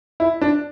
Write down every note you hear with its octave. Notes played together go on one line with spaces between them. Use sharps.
E4
D4